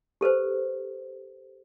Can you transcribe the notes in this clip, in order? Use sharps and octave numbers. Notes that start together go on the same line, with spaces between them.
G4 A4 B4 C5